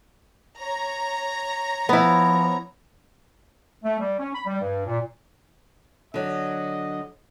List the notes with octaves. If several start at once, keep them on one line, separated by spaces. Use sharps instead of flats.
C#5 A#5
F3 B3 E4
A3
G3
C#4
B5
G3
G2
A#2
D3 F#3 D#5